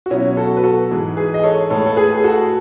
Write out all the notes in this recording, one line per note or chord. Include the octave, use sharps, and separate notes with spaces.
F#4
B2 F#3 C#4 E4
F#4 A4
B4
F#4 A4
G#2 E3 G#3
G#4 B4
D#5
A4 C#5
A2 G#3 A4 C#5
A4
G#4 B4
G#4
F#4 A4